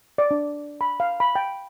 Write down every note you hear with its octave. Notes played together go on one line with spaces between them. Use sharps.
D5
D4
B5
F5
B5
G5